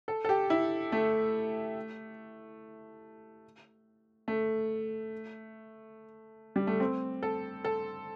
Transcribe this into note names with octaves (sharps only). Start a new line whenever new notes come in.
A4
A4
G4
E4
A3
A3
G3
A3
C4
A4
A4